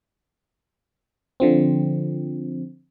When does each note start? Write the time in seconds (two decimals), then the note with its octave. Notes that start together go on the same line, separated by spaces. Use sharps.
1.40 D3 F3 C4